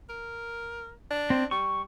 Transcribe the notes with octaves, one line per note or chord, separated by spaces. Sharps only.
A#4
D4
C4
G3 C#6